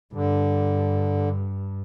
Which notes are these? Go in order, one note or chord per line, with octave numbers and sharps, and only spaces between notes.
G2 D3